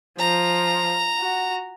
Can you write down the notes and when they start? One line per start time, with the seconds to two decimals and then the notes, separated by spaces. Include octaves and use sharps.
0.19 F3 A#5
1.19 F#4